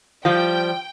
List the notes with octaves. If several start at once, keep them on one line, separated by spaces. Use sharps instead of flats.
F3 G3 G5